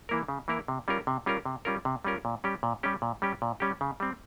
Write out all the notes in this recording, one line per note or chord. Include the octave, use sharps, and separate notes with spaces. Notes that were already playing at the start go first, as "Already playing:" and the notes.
E3 A#3 E4 A#4
C#3
E3 A#3 E4 A#4
C3
G3 C#4 F4 A#4
C3
G3 C#4 F4 A#4
C3
G3 C#4 F4 A#4
C3
G3 C#4 F4 A#4
A#2
G3 C#4 G4
A#2
G3 C#4 G4
A#2
G3 C#4 G4
A#2
G3 C#4 G4
C#3
G3 C4